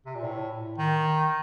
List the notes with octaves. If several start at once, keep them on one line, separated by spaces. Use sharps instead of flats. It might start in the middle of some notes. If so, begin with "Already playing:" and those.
C3
A#2
A2
D#3